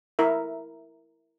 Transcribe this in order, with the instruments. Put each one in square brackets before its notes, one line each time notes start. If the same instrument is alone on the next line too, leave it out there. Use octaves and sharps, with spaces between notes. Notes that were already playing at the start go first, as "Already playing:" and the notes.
[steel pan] E4 A#4 E5